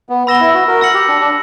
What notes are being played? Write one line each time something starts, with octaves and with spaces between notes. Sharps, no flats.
B3
B3 B5 E6 A#6 E7 G7
E4
F#4
F#4 A#4
E6 A#6 C#7 F#7
G4
D4
D4